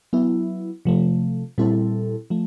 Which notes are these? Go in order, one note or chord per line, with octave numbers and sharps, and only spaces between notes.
F#3 B3 E4
C3 F3 A3
A#2 G3 C4 E4 A4
F3 A3